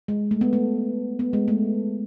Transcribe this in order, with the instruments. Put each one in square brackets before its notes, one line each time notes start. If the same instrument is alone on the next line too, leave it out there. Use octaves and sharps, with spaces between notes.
[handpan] G#3
A3
B3
A3
B3
G#3
A3